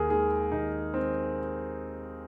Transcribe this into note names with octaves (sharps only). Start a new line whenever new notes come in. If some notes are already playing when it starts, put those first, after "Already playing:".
Already playing: D#2 G#4 A#4
D#3 G#3 G#4
D#2 D#4
D#3 G#3 C4